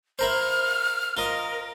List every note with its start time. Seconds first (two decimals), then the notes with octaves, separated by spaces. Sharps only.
0.19 E4 A#4 C5 F6
1.17 F4 A#4 D#5